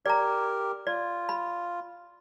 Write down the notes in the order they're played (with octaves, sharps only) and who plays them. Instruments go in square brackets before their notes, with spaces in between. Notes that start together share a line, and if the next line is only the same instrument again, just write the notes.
[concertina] G4 A#4 [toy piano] D5 A#5
[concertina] F4 [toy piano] D5
[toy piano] B5